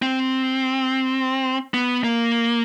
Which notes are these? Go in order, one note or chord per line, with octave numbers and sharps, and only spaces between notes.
C4
B3
A#3